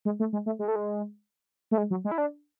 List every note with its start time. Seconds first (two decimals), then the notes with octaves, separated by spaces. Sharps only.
0.05 G#3
0.20 A3
0.33 G#3
0.46 A3
0.59 G#3
0.68 A3
0.76 G#3
1.71 A3
1.78 G#3
1.91 F#3
2.05 G#3
2.11 E4
2.18 D4